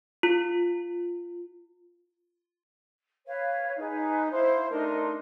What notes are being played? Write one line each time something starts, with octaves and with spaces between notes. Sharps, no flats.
F4
B4 C#5 F5
D#4 G#4 B4
E4 C5 F5 C6
A3 D4 D#4 A#4 C6